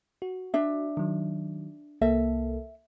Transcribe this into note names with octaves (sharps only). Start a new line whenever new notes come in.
F#4
D4 E5
D#3 F#3
C2 A#3 A4 E5